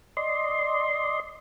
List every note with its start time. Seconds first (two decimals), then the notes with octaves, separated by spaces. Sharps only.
0.17 D5 D#5 C6